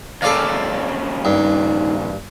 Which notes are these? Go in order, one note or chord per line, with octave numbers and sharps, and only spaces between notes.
D#2 C#3 A4 D5 F5
G2 D#4